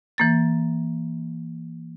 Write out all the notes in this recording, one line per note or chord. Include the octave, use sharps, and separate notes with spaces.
E3 A#3 A6